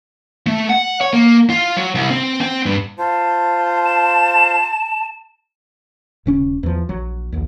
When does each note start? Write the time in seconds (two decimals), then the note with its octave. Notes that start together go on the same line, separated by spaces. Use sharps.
0.47 A3
0.70 F#5
1.01 C#5
1.13 A#3
1.50 F4
1.77 F#3
1.95 C2
2.10 C4
2.41 C4
2.66 G2
2.98 F4 C5 A5
3.85 E7
6.26 D#1 C#3 C#4
6.63 E2 F3
6.89 A#1 F#3
7.32 A#1 D#2